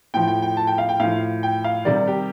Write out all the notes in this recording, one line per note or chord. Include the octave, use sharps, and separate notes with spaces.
A2 F3 G5
G5
G5
A5
G5
F5
G5
A2 F3 F5
G5
F5
C3 D#3 G3 D5
G4